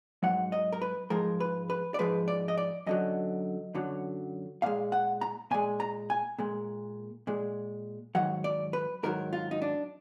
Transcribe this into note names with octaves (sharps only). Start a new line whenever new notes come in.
G#2 F#3 F#5
D#5
A#4
B4
G#2 F3 G#3 A#4
B4
B4
D5
G#2 F3 G#3 B4
D5
D#5
D5
F#2 D3 F#3 D#5
F#2 D3 F#3
A#2 G#3 F5
F#5
A#5
A#2 G#3 G#5
A#5
G#5
A#2 G#3
A#2 G#3
G#2 D#3 F#3 F#5
D5
B4
G#2 D#3 F#3 A#4
F4
D#4
D4